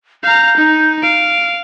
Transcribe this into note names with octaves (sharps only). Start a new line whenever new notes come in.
F5 A#5 G6
D#4
F5 D7